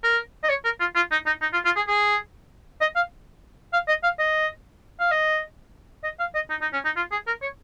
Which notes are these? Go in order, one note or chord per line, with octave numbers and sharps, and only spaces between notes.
A#4
D#5
C#5
A#4
F4
F4
D#4
D#4
D#4
F4
F4
G#4
G#4
D#5
F5
F5
D#5
F5
D#5
F5
D#5
D#5
F5
D#5
D#4
D#4
C#4
D#4
F4
G#4
A#4
C#5